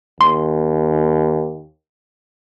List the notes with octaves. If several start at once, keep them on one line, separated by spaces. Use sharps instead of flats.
D#2 C6